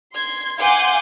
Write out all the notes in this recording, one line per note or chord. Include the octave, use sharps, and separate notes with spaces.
C6 G#6
F5 F#5 G#5 C6 D6 G6